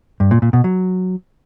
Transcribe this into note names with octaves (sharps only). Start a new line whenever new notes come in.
G2
A#2
A#2
B2
F#3